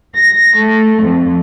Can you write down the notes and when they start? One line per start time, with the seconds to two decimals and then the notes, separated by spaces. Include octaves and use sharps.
0.15 A#6
0.56 A3
1.03 F2